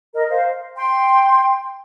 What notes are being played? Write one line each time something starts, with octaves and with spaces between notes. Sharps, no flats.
A#4 D#5
C5 F5
G5 C6